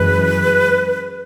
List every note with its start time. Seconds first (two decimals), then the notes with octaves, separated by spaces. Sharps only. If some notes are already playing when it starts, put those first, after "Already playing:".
Already playing: F#2 E3 G#3 B4